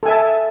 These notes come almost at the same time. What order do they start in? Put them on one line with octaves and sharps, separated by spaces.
A4 G#5 E5 A5